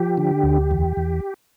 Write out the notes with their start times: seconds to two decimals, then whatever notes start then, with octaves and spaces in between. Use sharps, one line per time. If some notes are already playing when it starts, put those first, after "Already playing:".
Already playing: F3 G4
0.18 D3
0.44 D2
0.71 E2
0.97 E2